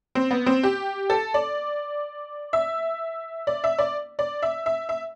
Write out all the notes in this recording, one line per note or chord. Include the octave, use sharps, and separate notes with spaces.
C4
B3
C4
G4
A4
D5
E5
D5
E5
D5
D5
E5
E5
E5